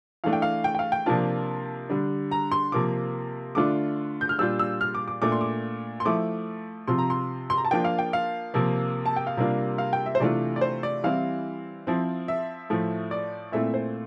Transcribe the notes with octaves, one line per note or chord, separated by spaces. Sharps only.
E3 A3 D4 F5
G5
F5
G5
G5
F5
G5
C3 F3 A#3 D4 F4 A5
D3 G3 D4
A#5
C6
C3 F3 A#3 F4 D6
D3 A3 D4 F4 D6
G6
F6
A#2 G3 D4 F4 E6
E6
F6
D6
D6
A#2 A3 D4 D6
C6
D6
C6
F3 A3 E4 D6
C3 F3 C4 F4 C6
A#5
C6
C6
A#5
A5
F3 A#3 D4 F4 G5
F5
G5
F5
C3 F3 A#3
A5
G5
F5
C3 G3 A#3 D4 F4
F5
G5
E5
C5
C3 E3 A3 D4 F4 D5
D5
C5
D5
E3 G3 C4 E4 F5
F3 C4 E4
E5
A2 F3 A3
D5
A#2 A3 C4 E4 E5
C5